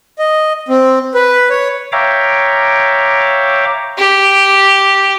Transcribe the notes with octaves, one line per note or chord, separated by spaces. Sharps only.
D#5
C4
B4
C#5
C#5 E5 F5 G5 A#5 D6
G4